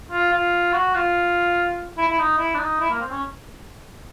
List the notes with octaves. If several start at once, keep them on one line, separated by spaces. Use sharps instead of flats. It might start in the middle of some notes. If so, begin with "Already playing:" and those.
F4
F4
F#4
F4
E4
E4
D#4
E4
D4
D#4
E4
A#3
C4
C#4